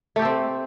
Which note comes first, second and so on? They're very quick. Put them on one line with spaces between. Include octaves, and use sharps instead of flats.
A3 G4 A4 C4